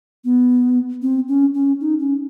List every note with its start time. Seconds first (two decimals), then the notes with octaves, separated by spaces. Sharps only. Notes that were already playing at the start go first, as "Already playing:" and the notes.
0.25 B3
1.02 C4
1.28 C#4
1.54 C#4
1.81 D#4
1.99 C#4